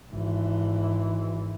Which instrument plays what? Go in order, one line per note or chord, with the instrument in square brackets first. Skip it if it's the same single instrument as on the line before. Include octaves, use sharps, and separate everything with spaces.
[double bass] G#1 E3